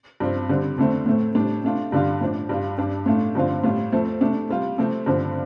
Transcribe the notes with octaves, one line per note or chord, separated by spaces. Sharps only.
G2 F3 C4
D3 G3 C4
F2 D3 A3 C4
A2 A3 C4
A2 G3 D4
C3 A3 D4 F4
G2 D3 G3 F4
A2 F3 D4
G2 G3 F4
G2 G3 D4
A2 A3 D4 F4
G2 D3 F3 C4 F4
A2 G3 F4
F2 F3 A3 C4
C3 A3 D4
C3 G3 F4
C3 F3 A3 C4
G2 D3 F3 C4